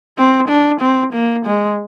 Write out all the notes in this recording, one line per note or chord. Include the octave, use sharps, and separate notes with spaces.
C4
D4
C4
A#3
G#3